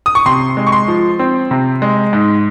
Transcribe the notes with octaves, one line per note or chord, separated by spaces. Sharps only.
D#6
C#6
C3 C6
G#3
C#6
C6
F3
C4
C3
G#3
G#2